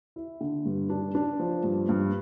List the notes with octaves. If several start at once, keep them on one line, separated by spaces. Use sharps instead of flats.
E4
D3
G2
D4
D4
F3
G2
G2